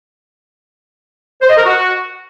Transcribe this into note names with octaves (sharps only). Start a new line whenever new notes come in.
C5
D#5
A#4
F#4